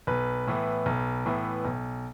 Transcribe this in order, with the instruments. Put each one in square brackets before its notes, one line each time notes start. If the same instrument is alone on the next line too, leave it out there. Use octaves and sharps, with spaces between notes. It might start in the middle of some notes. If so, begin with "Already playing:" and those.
[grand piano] B1 B4
A2 E3 B3
B1
A2 E3 B3
B1